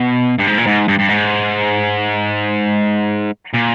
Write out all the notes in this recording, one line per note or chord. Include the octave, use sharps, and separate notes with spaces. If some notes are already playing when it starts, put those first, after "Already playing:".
Already playing: B2
G2
G#2
A#2
G#2
G2
G2
G#2
A#2